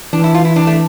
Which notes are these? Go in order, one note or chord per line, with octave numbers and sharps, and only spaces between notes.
E3 D4
E4
F4
E4
D4
A3